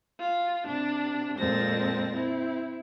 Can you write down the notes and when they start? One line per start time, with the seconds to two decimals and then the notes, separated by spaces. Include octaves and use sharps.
0.19 F4
0.66 C3 D4
1.37 F2 A#2 G#3 C4 A5 A#6
2.14 C4 E4